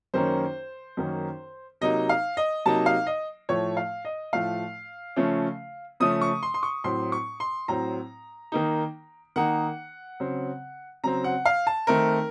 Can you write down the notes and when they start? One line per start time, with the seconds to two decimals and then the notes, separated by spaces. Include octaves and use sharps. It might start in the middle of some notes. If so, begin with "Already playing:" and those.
0.14 F#2 D#3 A#3 C#4 C5
0.97 F#2 D#3 A#3 C#4
1.81 C3 F#3 A#3 D#4 D#5
2.09 F5
2.37 D#5
2.65 C3 F#3 A#3 D#4 A5
2.86 F5
3.07 D#5
3.49 A2 F3 A3 C#5
3.77 F5
4.05 D#5
4.33 A2 F3 A3 F5
5.16 C#3 F3 A3 C#4
6.00 C#3 F3 A3 C#4 D#6
6.21 C#6
6.43 C6
6.54 C6
6.63 C#6
6.84 A2 F#3 C4 C6
7.12 C#6
7.40 C6
7.68 A2 F#3 C4 A#5
8.52 D#3 A#3 D#4
9.36 D#3 A#3 D#4 F#5
10.20 C#3 F#3 C4
11.04 C#3 F#3 C4 A#5
11.24 F#5
11.45 F5
11.67 A5
11.87 D#3 A3 C4 A#4